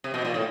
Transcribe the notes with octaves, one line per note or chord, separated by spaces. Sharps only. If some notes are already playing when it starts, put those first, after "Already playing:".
C3
B2
A#2
A2